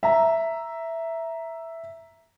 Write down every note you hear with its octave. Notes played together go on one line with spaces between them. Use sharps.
E5 A#5